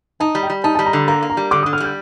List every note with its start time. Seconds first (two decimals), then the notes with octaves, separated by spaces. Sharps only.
0.20 D#4 A5
0.35 G3
0.43 G5
0.50 G3
0.64 D#4 A5
0.75 G3 A5
0.86 A#5
0.93 D3
1.08 A#3 A#5
1.23 A#3
1.30 A#5
1.37 G3
1.51 D3 D6
1.63 D#6
1.66 D3
1.73 F6
1.80 G3 G6